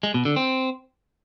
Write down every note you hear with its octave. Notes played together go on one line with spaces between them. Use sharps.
G#3
B2
D3
C4